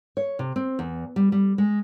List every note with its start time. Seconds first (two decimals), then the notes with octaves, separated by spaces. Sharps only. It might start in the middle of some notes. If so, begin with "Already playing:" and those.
0.17 C#5
0.39 C3
0.56 C4
0.79 E2
1.16 G3
1.32 G3
1.58 G#3